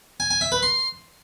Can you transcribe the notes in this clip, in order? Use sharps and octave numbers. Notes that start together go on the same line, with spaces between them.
G#5
G#5
E5
B4
C6